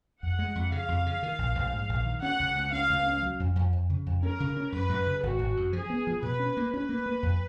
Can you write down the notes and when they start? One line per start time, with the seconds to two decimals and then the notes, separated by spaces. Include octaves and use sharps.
0.23 F2 F#5
0.39 G#3
0.55 F2
0.72 C#3 F5
0.88 F2
1.06 C#3
1.23 D#3
1.39 A#1
1.55 A#1
1.72 G#2
1.89 A#1
2.05 D#3
2.22 C#4 F#5
2.39 C#2
2.55 C#2
2.72 C#4 F5
2.89 C#2
3.06 C#4
3.22 F#3
3.40 F2
3.56 F2
3.73 F2
3.90 C#3
4.06 F2
4.23 C#4 A#4
4.40 C#3
4.57 C#4
4.72 F#2 B4
4.89 F#2
5.07 C#3
5.23 G#1 F#4
5.39 G#1
5.57 F#2
5.73 F3 G#4
5.90 B3
6.07 F3
6.22 B2 B4
6.39 C#4
6.57 A#3
6.73 C#4 B4
6.89 A#3
7.06 A#3
7.23 F2